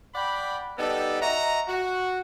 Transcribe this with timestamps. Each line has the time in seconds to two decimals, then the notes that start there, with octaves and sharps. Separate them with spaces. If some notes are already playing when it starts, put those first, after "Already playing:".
0.15 D5 F#5 G5 B5
0.78 G3 B3 D#4 G4 A4
1.21 F#4 D#5 E5 A#5
1.68 F#4